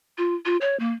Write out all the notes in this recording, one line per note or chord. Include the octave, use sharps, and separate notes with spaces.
F4
F4
C#5
A#3